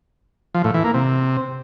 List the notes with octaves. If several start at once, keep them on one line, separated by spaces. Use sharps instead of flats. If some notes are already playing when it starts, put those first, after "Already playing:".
F3
A2
E3
A#3
C3